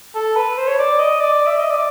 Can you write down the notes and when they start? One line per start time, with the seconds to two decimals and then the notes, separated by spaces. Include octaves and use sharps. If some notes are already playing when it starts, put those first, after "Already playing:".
0.15 A4
0.36 B4
0.57 C5
0.67 C#5
0.78 D5
0.99 D#5
1.20 D5
1.47 E5
1.59 D#5
1.70 D5